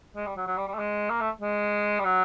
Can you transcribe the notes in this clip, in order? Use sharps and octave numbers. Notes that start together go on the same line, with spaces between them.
G#3
G3
F#3
F#3
G3
G3
A3
G#3
A#3
A3
G#3
G3
F#3